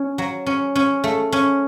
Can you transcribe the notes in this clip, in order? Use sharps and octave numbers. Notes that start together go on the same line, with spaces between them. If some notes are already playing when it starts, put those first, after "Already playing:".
Already playing: C#4
F#3
C#4
C#4
A3
C#4